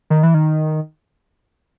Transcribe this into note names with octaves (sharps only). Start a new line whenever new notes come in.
D#3
E3
D#3